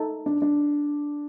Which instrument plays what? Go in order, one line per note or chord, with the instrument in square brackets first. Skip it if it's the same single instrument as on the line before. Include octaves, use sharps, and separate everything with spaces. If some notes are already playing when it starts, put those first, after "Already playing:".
Already playing: [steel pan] D#4 A4
[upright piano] D4
D4